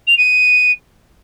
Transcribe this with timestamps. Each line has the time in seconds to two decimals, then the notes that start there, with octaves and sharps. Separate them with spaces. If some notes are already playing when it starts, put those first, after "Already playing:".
0.07 F7
0.17 D#7